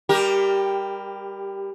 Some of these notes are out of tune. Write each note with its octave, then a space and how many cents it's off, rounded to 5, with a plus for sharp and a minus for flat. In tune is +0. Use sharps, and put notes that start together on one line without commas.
G3 +25 G4 +0 A#4 +15